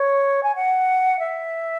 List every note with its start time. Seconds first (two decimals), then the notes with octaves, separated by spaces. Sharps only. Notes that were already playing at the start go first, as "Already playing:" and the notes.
Already playing: C#5
0.43 G#5
0.56 F#5
1.19 E5